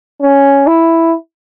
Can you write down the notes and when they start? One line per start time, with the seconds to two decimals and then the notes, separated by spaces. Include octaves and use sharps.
0.22 C#4
0.67 E4